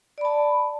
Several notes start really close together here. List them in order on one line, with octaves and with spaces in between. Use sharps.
D5 B5 A5